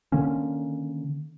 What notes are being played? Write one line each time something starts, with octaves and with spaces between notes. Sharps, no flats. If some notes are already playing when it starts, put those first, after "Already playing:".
D3 D#3 A#3 C#4